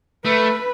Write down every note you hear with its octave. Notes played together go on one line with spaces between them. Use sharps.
A3 B4